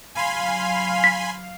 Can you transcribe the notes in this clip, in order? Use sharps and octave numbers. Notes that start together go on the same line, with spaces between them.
F#3 F5 G#5 B5 C6
B6